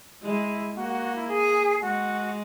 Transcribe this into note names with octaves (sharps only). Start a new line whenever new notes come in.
G#3 E4
A#3 F#4
F#4
F#4
E4
G#4
G#3 F#4